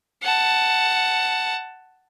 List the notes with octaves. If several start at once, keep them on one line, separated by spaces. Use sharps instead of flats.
F#5 A5